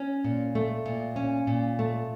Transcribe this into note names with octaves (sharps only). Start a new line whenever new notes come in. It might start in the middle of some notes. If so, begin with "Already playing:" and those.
Already playing: C#4
A#2
A3
A#2
C#4
A#2
A3